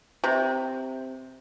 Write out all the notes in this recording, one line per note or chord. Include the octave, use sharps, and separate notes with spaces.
C3